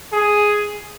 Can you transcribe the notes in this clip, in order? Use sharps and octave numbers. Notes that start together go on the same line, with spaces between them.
G#4